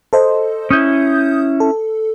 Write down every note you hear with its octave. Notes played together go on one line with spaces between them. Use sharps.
A4 C5 D#5
C#4 E4 D#6 G6
A4